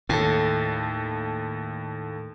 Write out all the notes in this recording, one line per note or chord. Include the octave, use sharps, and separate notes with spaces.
D#2 A2 A4